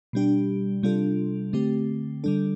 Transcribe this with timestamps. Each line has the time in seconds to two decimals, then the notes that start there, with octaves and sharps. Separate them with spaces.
0.13 B2 G3 D4 G4
0.83 C3 G3 D4 F4 A4
1.53 D3 A3 C4 G4
2.24 D3 G3 D4 A4